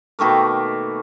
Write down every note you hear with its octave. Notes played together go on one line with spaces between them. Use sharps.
B2 D#3 A3 A#3